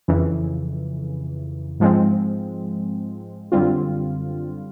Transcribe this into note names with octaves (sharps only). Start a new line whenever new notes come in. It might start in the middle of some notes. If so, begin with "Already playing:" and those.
F2 C#3 E3
G#2 F3 G#3 C4
F#2 D3 G3 C4 F4